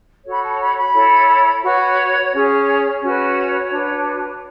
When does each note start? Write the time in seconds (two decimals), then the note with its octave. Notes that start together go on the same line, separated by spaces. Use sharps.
0.25 F#4 A4 C#5
0.32 B5
0.43 A5
0.60 B5
0.77 B5
0.94 E4 A4 C#5
1.63 F#4 B4 C#5
2.32 C#4 G#4 C#5
3.01 C#4 F#4 B4 C#5
3.71 D4 F#4 B4